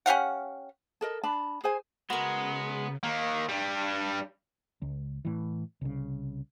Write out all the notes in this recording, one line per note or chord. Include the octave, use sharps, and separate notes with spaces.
C#4 G4 F5 F#5
A4 A#4 D#5
D4 A5 B5
G#4 C5 G#5
C#3 G#3 B3 F#4 A#4
D#3 A#3
G2 G3
C#2
A2 E3
C2 C#3